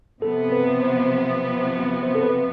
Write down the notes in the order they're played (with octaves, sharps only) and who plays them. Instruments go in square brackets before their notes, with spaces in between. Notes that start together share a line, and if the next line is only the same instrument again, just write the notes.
[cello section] C3 F3 B3 [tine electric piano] A4
[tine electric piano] B4
C5
C5
A4
B4